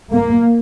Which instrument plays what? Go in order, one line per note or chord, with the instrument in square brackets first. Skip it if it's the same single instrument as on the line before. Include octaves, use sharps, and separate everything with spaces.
[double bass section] A#3